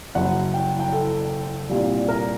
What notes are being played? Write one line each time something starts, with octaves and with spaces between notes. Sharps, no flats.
F#1 F#2 F#3 F#5
G5
G5
A4
C2 A#2 G3
A#4